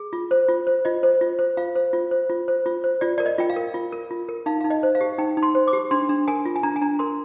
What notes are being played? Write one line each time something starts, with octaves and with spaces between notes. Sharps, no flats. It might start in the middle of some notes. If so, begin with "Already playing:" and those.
Already playing: G#4
F4
C5
F4
C5
F4 D#5
C5
F4
C5
F4 F5
C5
F4
C5
F4
C5
F4
C5
F4 D5
A#4 D5
D#5
F4 G5
F5
A#4
F4
A#4
F4
A#4
D#4 F5
D#4 F5
D#5
C5
F5
G4
D#4 G5
D#4
C6
C5
D6
G4
D4 C6
D4
A#4 G#5
F4
G#5
D4 A#5
G#5
D4 A#5
A#4 C6